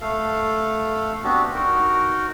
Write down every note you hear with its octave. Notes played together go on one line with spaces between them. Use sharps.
A3 A4 F5
B3 C4 D4 F#4 G4
D#4 F#4 A#4